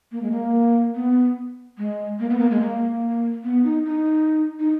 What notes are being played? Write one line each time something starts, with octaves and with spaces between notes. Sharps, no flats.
A#3
G#3
A#3
B3
G#3
A#3
B3
A#3
G#3
A#3
B3
D#4
D#4
D#4